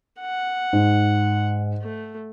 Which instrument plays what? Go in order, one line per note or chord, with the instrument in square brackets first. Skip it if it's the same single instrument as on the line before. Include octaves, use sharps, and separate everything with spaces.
[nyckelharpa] F#5
[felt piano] G#2
[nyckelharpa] A3